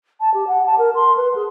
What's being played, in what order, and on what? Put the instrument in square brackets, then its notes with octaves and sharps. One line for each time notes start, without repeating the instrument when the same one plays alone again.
[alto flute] A5
G4
F#5
A5
A#4
C6
B4
G#4